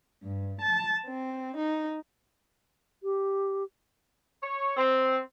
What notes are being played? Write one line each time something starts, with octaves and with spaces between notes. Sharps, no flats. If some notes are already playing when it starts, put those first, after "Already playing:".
G2
A5
C4
D#4
G4
C#5
C4